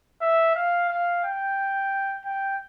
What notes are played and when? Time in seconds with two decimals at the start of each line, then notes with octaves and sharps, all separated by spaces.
0.21 E5
0.55 F5
0.89 F5
1.24 G5
2.25 G5